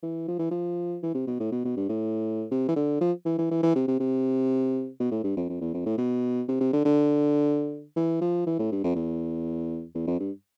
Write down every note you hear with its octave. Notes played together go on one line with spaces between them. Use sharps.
E3
F3
E3
F3
E3
C3
B2
A2
B2
B2
G2
A2
C3
E3
D3
F3
E3
E3
E3
E3
C3
C3
C3
B2
A2
G2
F2
F2
E2
F2
A2
B2
C3
C3
D3
D3
E3
F3
E3
A2
G2
F2
E2
E2
F2
G2